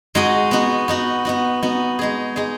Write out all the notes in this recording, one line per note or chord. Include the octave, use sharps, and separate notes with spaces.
G#3 D#4 F#4 D#5
B3 D#4 F#4
B3 D#4 F#4
B3 D#4 F#4
B3 D#4 F#4
G#3 D#4 G#4
G#3 D#4 G#4